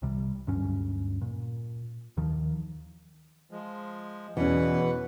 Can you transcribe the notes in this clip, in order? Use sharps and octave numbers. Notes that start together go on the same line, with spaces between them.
C2 C3 G3
D2 G2 F#3 C#4
A#2
D#2 D#3 F3
F3 G#3
E2 B2 E3 C#4 B4 F#5